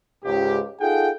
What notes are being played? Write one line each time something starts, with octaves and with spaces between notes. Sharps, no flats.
C#2 G#2 G4
D#4 F4 G#4 A4 F#5 G5